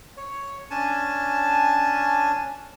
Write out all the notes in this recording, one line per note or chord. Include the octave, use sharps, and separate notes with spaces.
C#5
C#4 D4 G#5 A5